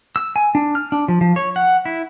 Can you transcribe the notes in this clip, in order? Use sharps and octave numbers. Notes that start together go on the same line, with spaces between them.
E6
G#5
D4
F6
D4
F3
F3
C#5
F#5
E4